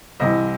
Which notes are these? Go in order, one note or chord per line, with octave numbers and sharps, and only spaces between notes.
C2 C3 E3 D#5